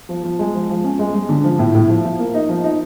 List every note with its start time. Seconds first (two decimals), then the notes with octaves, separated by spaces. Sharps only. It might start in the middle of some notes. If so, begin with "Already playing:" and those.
0.09 F3
0.24 F3
0.39 G#3
0.54 F3
0.70 F3
0.84 C#4
0.99 G#3
1.14 G#3
1.29 D3
1.44 F3
1.59 A2
1.75 A2
1.89 F3
2.04 F3
2.19 A#3
2.34 D#4
2.49 F3
2.64 D#4